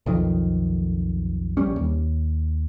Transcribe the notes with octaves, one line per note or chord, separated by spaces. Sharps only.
B1 F2 D#3
A#1 G3 C#4
D#2